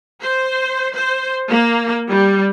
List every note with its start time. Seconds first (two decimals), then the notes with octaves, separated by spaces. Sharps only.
0.22 C5
0.95 C5
1.49 A#3
2.09 G3